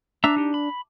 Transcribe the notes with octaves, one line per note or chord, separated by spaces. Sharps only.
D4 E5 A#5 E6
D#4 G4
B5